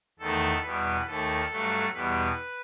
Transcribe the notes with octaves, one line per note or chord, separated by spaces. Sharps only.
E2 D#3 A3 A4
E2 B2 G3 B4
D#2 D#3 A3 A4
G2 F#3 A3
E2 B2 G3 B4